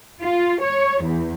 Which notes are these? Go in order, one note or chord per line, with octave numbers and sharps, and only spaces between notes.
F4
C#5
E2